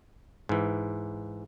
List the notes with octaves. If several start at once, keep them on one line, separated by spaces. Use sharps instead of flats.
G#2 E3